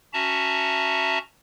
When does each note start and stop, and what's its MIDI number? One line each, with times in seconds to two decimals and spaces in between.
0.13 1.18 61
0.13 1.18 66
0.13 1.18 76
0.13 1.18 81
0.13 1.18 82